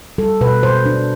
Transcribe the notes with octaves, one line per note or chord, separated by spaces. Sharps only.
G3 A4
B2 B4
B2 C5
D4